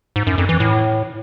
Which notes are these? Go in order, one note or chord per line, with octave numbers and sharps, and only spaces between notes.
G#2
F#2
F2
E3
A2